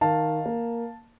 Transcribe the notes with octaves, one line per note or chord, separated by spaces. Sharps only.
D#3 F5 A5
A#3